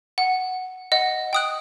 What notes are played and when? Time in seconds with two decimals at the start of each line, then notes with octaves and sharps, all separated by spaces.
0.18 F#5
0.92 D#5 F#5
1.33 G5 D#6 F#6